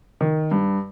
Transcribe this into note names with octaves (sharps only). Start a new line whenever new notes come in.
D#3
G2